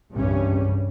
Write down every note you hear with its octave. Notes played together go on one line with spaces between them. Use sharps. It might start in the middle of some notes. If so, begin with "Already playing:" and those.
C2 G2 C#3 E3 G3 C#4